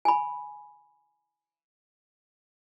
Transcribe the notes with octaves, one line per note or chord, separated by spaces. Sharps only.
G#5 B5